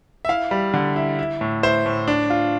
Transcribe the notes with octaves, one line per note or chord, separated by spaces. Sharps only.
E5
E4 F5
G3
D3
E4
E4
A2
E4 C5
A2
D4
F4